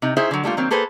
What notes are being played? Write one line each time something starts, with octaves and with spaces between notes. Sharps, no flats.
C3 D#4
C#4 D#4 E4 G#4 C5 E5
D3 F#3
G3 A3 A#3 F4
D#3 F#3 A#3 C4
A#3 G#4 A4 B4 C5